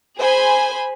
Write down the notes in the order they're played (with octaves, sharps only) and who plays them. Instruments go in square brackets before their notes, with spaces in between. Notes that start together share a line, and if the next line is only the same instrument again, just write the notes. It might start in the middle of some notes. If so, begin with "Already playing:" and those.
[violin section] G#4 C5 G#5 B5